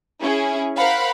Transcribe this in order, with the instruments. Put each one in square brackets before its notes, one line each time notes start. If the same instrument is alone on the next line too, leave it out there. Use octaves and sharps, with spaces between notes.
[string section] C#4 E4 G#4
A#4 C5 F5 F#5 B5